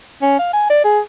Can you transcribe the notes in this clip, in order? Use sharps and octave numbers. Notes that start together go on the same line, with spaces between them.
C#4
F5
G#5
D5
G#4